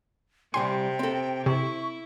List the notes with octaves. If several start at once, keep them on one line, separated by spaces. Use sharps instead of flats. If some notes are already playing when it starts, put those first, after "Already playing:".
C2 C3 G3 G5 G#5 C6
C4 A4
C3 E4 C#6